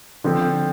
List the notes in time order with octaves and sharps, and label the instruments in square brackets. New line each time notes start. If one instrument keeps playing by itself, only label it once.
[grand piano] D3 F3 C4